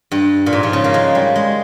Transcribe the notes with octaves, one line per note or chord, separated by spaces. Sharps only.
G2
A#2
G#2
F3
C#3
A#3
G#3
G3
G#3